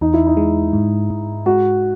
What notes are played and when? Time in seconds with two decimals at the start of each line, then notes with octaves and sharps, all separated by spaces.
0.01 E2 D#4
0.14 E4
0.27 D#4
0.37 G#3
0.73 G#2
1.10 G#2
1.46 G#3 F#4